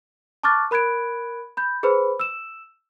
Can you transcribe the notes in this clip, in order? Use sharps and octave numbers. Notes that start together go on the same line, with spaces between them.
A5 C#6 D6 F6 F#6 A6
A#4 B5 F#6 G#6 D7
B5 G6
G#4 B4 C5 B5
E6 E7